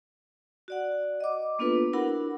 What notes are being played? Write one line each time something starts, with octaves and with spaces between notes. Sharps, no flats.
F#4 D5 F#5
D#5 D6
A#3 B3 D4 F4 A4 B4
D4 E4 F#4 A#4 F#5 B5